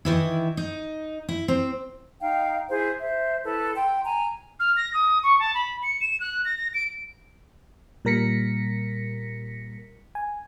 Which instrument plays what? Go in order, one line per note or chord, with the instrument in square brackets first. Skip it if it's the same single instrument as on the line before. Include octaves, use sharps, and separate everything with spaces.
[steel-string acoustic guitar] D#3 E3 E4
D#4
E4
C4
[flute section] D#4 F5 G5
E4 G#4 C5
C5 E5
E4 A4 B4
G5 C6
G#5 A#5
[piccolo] F6
A#6
D#6
C#6
A5
B5
C#7
E7
F#6
A#6
A#6
D7
[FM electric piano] A#2 G3 A#4 A#6 B6 C#7
G#5